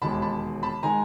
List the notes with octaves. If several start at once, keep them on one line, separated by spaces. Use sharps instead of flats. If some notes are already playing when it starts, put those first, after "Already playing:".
E1 D#2 D#3 G#3 A5 B5
A5 B5
A5 B5
D#3 G#3 G#5 A#5